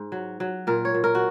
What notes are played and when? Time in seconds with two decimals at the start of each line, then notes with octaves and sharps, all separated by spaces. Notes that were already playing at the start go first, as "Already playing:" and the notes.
Already playing: G#2
0.12 F#3
0.40 F#3
0.67 A#2 A#4
0.85 C#5
0.94 A#2
1.04 A#4
1.15 F#4